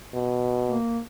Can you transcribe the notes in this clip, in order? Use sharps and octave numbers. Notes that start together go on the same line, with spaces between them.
B2
A#3